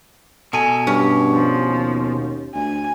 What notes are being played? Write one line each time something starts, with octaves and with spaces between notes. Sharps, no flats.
B2 A4 G#5
G2 C#4
F3
D#2
D2 G#5